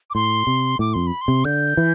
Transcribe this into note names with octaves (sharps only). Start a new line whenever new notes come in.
D6
A2 C6
C3
A2 D6
F2 C6
B5
C6
C3
D3 G6
E3